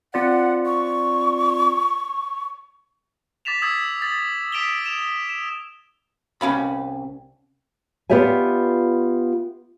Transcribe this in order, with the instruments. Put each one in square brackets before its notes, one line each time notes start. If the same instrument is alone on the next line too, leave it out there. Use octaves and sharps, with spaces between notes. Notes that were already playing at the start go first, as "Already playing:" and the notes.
[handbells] C4 F4 D5 [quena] F#5
[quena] C#6
[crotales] D6 A6 B6 E7 F7
D#6 E6 G#6 A6 B6
A6
D#6 B6 D7 E7 F7 G7
D7 E7 F7
E7
[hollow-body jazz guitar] C2 C#4 F5 B5
[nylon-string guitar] B3 F4 G4 D5 E5 G#5